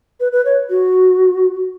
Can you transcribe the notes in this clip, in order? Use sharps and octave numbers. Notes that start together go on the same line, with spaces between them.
B4
B4
C#5
F#4